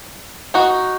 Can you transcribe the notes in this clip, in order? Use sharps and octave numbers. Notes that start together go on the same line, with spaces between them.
D#4 F#4